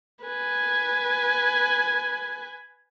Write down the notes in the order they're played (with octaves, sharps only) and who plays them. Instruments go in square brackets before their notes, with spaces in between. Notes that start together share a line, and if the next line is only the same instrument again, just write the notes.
[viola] B4 G#5